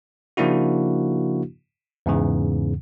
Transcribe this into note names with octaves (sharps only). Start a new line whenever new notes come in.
C#3 F3 A#3 D4 E4 F#4
E2 G#2 C#3 E3